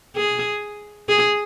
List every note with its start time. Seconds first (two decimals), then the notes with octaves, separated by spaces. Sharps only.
0.16 G#4
1.09 G#4